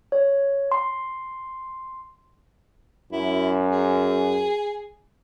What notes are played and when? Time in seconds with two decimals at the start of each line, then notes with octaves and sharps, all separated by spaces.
0.12 C#5
0.72 C6
3.12 F#2 E4
3.71 G#4